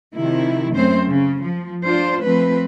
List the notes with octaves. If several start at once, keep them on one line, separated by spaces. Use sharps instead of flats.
C3 D#3 F3 E4
F#2 A3 C4 C#4 C5
C#3
F3
D4 F4 C5
F3 A3 C4 B4